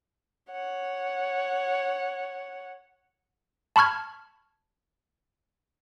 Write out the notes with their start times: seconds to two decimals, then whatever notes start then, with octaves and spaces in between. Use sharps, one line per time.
0.52 C#5 F#5
3.76 A5 B5 C#6 F6 G#6